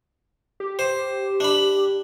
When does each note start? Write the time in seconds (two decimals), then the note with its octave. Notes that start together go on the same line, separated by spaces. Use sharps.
0.60 G4
0.79 C5
1.40 D4 B5